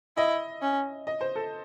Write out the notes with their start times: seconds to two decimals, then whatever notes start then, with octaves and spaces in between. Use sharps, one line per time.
0.17 E4 D#5
0.62 C#4
1.07 D#5
1.21 C5
1.35 A4